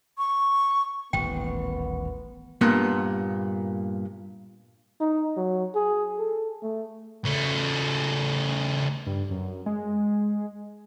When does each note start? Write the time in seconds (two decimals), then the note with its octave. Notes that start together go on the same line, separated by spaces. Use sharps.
0.18 C#6
1.13 D#1 A1 B3 G5
2.61 G2 A#2 B3
5.01 D#4
5.37 F#3
5.75 G#4
6.19 A4
6.63 A3
7.25 C#3 A3
9.07 G2
9.31 F#2
9.66 G#3